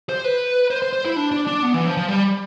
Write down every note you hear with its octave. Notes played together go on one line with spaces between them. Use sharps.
C5
B4
C5
C5
C5
E4
D4
D4
D4
B3
E3
F3
F3
G3